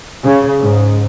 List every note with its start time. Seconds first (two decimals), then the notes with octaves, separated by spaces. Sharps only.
0.23 C#3
0.60 G#2